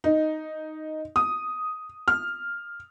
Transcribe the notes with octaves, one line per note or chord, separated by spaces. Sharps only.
D#4
D#6
F6